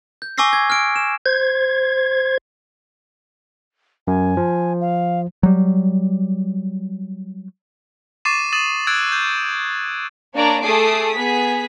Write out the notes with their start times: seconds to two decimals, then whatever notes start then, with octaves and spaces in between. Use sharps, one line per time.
0.22 G6
0.38 G#5 C#6 D6 E6 A#6 C7
0.53 G#6
0.70 F6 D7
0.96 E7
1.26 C5 G#6
4.07 F#2 G#5
4.37 F3
4.81 F5
5.43 F#3 G3
8.25 C#6 D6 A6 C7 D#7 E7
8.53 D#6 A6 D#7 E7 F#7
8.87 E6 F#6 G#6 A6 D7
9.12 G6
10.34 A#3 D4 C#5 D5 A#5
10.63 A3 G#4 A4 D6 D#6 C7
11.14 B3 G#4 B6